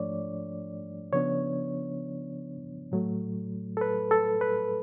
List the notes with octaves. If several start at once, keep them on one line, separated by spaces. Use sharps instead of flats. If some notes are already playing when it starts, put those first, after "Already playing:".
Already playing: G#2 F3 A3 D4 C#5 D5
C#3 F3 B3 D4 C#5
A2 F#3 A3
A4
B4
A4
B4